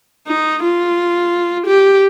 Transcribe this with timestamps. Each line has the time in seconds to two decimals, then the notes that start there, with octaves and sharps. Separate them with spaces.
0.28 D#4
0.64 F4
1.67 G4